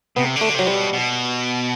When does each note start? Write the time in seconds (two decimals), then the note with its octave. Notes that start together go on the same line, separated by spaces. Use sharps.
0.16 C3 B3
0.36 D3
0.41 A3
0.54 C3 F#3
0.67 G3
0.74 B2
0.93 B2